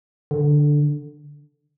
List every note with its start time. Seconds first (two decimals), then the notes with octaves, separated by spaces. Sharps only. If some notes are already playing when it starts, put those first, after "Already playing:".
0.31 D3